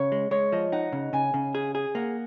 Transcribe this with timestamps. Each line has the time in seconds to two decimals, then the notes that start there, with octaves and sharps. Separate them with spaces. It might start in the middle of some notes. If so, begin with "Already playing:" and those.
Already playing: C#3 C#5
0.12 G#3
0.31 G#3 C#5
0.52 F3 D#5
0.72 D#4 F#5
0.92 C#3
1.13 C#3 G#5
1.34 C#3
1.55 G#4
1.75 G#4
1.95 A#3 F#5